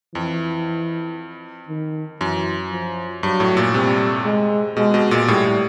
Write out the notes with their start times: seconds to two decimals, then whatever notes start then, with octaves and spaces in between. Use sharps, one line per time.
0.15 F2 E3
1.69 D#3
2.20 F#2 E3
2.71 F3
3.23 G2 F#3
3.40 A2
3.57 A#2
3.74 C3 G3
4.25 G#3
4.77 B2 G#3
4.94 B2
5.11 A#2
5.28 A2 G3
5.45 A2